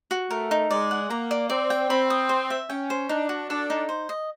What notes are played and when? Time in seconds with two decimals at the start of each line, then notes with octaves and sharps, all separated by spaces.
0.11 F#4
0.30 A3 A#4
0.51 D#4
0.70 G#3 D5
0.91 F#5
1.10 A#3 A#5
1.31 D5
1.49 C4 D5
1.70 G5
1.90 C4 B5
2.10 D#6
2.29 C5
2.50 E5
2.70 C#4 G5
2.90 C5
3.09 D4 D#4
3.29 F#4
3.49 D4 A4
3.70 D#4
3.89 C5
4.09 D#5